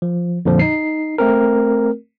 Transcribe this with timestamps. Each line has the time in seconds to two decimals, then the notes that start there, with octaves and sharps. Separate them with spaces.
0.02 F3
0.45 F2 A#2 D3 F3
0.59 D#4 C7
1.18 A3 C4 A#4